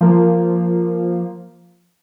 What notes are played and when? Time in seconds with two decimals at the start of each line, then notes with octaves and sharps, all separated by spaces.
0.01 F3 A#3